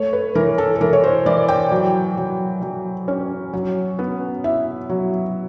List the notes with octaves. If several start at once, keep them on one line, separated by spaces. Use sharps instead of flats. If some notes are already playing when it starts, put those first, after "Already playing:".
Already playing: A3 C#5
B4
E3 A#4
A4
A4
E3 A#4
C#5
C5
E3 D5
G5
F#3
F#3
F#3
C#4
F#3
B3
E4 E5
F#3